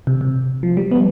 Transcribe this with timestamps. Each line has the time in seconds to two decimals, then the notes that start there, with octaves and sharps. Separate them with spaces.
0.07 C3
0.21 C3
0.63 F3
0.77 G3
0.91 B3